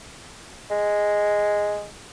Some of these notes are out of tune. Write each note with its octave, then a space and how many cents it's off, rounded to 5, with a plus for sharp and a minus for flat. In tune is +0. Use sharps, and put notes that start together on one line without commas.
G#3 -5